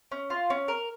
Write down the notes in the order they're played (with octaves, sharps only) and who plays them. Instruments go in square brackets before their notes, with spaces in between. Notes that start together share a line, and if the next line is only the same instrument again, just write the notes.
[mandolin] C#4
F4
C#4
A#4